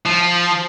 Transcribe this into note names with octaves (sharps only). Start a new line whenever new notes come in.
F3